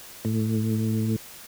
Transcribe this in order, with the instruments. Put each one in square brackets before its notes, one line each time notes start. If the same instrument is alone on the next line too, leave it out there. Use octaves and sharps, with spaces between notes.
[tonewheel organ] A2